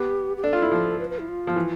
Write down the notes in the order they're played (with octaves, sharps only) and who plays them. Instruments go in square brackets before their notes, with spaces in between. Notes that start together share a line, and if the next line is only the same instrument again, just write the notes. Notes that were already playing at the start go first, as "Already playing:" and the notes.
Already playing: [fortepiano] B3 [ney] G4
[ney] G4
[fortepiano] D4 [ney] A4
[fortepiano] F4
E4
F3
[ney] B4
B4
E4
F4
[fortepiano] F3
E3